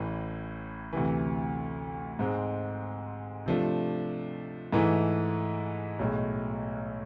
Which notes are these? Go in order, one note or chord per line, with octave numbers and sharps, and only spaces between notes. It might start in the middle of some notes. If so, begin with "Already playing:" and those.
Already playing: A1 A2 E3
D2 C3 E3
G#2 G#3 C4
C3 F3 A3 D4
G#2 E3 A3 E4
B1 A2 G#3